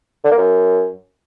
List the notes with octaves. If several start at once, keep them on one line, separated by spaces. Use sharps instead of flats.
D3
A#3
F#2